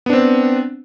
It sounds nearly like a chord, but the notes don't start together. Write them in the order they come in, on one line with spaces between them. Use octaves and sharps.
B3 D4 C4